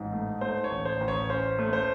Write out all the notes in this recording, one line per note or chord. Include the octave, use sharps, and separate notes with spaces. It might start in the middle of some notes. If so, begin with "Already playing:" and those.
Already playing: A1 G#2
A3
A3 C5
C#5
A1
C5
A1
C#5
C#5
C#4 C5
A3
C5